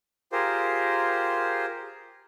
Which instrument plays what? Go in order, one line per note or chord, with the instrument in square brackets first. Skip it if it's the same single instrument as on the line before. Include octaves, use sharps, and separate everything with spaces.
[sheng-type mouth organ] F4 G4 G#4 A#4 C5